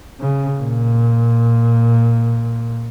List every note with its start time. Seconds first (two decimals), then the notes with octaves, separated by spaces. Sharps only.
0.20 C#3
0.58 A#2